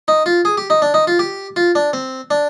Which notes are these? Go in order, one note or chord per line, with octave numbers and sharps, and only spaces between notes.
D#4
F4
G#4
G4
D#4
D4
D#4
F4
G4
F4
D4
C4
D4